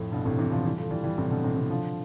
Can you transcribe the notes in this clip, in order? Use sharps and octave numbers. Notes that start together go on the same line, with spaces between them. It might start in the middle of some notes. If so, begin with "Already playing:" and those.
Already playing: F2 A2
G2 B2
A2 C3
C3 E3
D3 F3
E3 G3
F3 A3
E3 G3
E3 G3
A2 C3
B2 D3
A2 C3
C3 E3
D3 F3